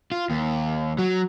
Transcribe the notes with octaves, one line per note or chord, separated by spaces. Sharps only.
F4
D#2
F#3